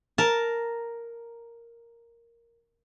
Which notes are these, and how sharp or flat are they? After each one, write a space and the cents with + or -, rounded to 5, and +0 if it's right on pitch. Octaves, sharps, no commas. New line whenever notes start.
A#4 +0 A5 +0